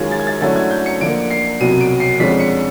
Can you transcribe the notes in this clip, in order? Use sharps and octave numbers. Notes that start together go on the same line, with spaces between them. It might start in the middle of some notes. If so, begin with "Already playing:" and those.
Already playing: F#2 D#3 G#3 C#4 F4 G#6
A6
G#6
A6
D3 F#3 A3 C#4 E4 A6
G#6
G6
C#7
D3 F3 A#3 D7
C7
C2 B2 F#3 D#7
D7
C7
F2 D3 F3 G#3 C#4 B6
C#7